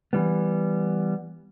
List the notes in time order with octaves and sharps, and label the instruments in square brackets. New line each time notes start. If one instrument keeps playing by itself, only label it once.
[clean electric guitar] E3 G3 B3